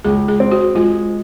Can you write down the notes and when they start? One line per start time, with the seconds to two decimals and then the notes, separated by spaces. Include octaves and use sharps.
0.05 C#2 G#4
0.28 G#4
0.40 C4
0.51 F#4
0.75 G#3 F4